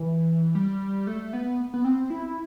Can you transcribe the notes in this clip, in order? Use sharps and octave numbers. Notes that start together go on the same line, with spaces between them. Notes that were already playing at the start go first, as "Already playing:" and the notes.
Already playing: E3
G3
A3
B3
B3
C4
E4